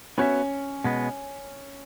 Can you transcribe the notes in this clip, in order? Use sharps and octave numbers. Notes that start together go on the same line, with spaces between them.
B3 C#4 F#4 C#5 E5
B2 G#3 B3